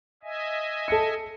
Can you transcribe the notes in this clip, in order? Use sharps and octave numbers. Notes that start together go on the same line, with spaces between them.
D#5 E5 G#5
A4 C#7